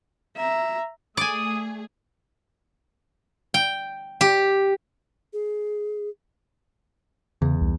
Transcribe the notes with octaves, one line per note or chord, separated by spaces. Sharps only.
E5 A#5
A3 G#4 D5 G#5 D#6
G5
G4
G#4
E2 C#3
C2